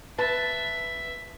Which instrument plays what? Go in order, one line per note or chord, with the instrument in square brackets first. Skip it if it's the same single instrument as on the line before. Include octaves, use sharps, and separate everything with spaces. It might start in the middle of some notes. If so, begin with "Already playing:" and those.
[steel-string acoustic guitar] B4 [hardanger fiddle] E5 [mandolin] A5